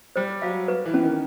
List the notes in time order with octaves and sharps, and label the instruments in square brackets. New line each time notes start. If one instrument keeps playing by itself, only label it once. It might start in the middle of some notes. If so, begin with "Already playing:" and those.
[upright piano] G3 [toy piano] C5
[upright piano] F#3 [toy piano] F5
[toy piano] B4
[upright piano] E3
[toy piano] C#4
[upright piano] D#3